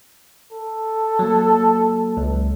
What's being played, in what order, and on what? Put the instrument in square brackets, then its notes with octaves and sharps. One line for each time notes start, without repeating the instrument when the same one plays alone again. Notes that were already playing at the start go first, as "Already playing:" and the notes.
[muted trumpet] A4
[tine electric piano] F#3 A#3
C#2